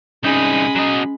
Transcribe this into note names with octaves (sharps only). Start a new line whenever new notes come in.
C2 G#3 C#4 D#4 B5
F#3 D#5